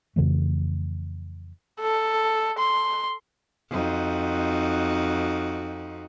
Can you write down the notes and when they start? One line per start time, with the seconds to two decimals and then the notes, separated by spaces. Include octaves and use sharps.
0.16 F2 C#3 E3 A3
1.81 A4
2.59 C6
3.71 F2 D#4 F#4